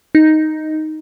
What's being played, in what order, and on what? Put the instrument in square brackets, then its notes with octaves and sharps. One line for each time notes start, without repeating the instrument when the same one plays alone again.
[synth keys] D#4